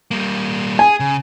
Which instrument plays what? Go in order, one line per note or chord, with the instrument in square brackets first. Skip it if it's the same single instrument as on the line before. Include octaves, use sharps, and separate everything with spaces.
[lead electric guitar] G3 A#3
[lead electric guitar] G#4 [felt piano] G#5
[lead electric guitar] C#3